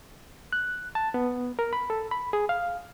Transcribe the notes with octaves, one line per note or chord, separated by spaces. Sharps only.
F#6
A5
B3
A#4
B5
A4
B5
G#4
F5